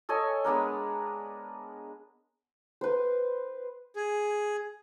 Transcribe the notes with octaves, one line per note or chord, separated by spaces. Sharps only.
A4 C#5 D#5 G#5
G#3 B3 D4 A#4
B4 C5
G#4